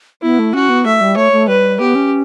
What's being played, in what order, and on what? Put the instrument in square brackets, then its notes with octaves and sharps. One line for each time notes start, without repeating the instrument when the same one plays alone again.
[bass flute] B3 [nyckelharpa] E4
[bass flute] A3
[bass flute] C#4 [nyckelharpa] F#4
[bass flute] B3
[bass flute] A3 [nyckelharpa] E5
[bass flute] G3
[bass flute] A3 [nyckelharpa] C#5
[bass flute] A3
[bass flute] G3 [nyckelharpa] B4
[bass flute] B3 [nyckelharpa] G4
[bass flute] C#4